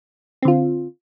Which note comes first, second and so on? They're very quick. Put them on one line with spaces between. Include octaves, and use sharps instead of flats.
C4 D3 F4